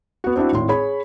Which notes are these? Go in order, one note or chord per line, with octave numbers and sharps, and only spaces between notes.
B3 F#4
C4 D4 E4 F#4
G#1 A2 C6
G#4 C#5 B5